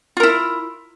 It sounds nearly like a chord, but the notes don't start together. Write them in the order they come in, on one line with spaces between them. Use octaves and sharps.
F4 A#4 E4